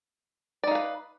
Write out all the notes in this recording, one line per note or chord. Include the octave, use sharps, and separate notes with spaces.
D#4 B4 D5 F5